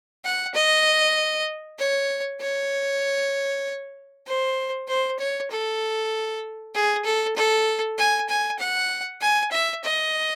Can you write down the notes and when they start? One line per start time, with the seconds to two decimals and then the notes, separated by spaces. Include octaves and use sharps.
0.25 F#5
0.55 D#5
1.78 C#5
2.41 C#5
4.27 C5
4.88 C5
5.19 C#5
5.51 A4
6.75 G#4
7.05 A4
7.36 A4
7.98 G#5
8.29 G#5
8.59 F#5
9.21 G#5
9.52 E5
9.84 D#5